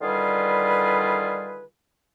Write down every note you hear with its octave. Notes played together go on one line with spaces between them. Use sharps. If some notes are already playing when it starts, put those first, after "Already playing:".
D3 D#3 G3 F4 G#4 B4